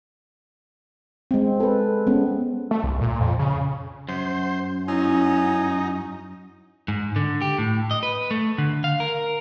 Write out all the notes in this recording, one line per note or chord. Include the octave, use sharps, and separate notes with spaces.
G#3 C4
A4 B4
G#3 B3 C#4
A3
C2
A#2
F2
C#3
F#2 C5
C#4 D#4 E4
G#2
D3
G4
A2
D#5
B4
A3
D3
F5
A#4